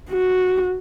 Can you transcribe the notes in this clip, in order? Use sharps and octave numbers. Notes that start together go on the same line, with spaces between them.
F#4